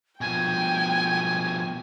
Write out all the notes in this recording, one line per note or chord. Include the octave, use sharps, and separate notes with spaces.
B2 F3 G5 G#5